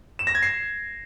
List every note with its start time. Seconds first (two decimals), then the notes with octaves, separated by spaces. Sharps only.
0.19 E7
0.27 A#6
0.35 G#6
0.43 C7